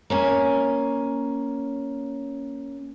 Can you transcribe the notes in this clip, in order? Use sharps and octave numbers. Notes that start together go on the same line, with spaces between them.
A#3 C#4 G#5